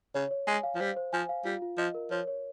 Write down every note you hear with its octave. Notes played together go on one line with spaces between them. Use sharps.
C#3 C#5
C#5
G#3 G#5
F5
F3
G3 C5
C5
F3 G#5
F5
G3 F4
F4
F3 D#5
A#4
F3 C#5
C#5